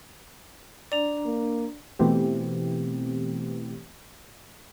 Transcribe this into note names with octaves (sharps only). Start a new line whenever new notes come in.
D4 D5 A#5
A#3
B2 E3 A3 B3 C4 G4